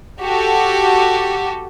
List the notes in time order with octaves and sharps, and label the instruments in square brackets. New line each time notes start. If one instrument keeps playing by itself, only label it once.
[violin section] F#4 G4 A4